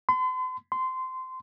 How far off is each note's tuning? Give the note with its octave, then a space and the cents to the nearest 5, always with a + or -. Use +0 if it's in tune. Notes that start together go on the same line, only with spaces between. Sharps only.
C6 -45
C6 -20